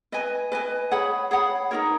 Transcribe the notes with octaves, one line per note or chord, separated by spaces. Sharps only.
B4 D#5 G#5
B4 D#5 G#5
G#4 C#5 F#5 B5
G#4 C#5 F#5 B5
D#4 F#4 A#4 C#5